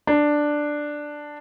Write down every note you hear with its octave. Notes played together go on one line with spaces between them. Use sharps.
D4